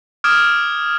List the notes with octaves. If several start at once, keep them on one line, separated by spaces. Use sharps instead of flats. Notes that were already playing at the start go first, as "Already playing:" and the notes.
D6 D#6 F6 G#6 D7 E7